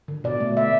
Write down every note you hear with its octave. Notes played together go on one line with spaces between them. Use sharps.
D3
B2 D5
A3
A3 E5